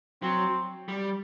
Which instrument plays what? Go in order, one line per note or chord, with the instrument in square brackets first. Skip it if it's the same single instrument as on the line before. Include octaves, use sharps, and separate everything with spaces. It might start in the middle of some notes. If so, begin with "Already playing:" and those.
[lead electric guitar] F#3 [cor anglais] C4
[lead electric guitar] G3